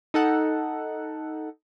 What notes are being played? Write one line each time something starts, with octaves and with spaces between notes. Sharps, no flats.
D#4 A4 F#5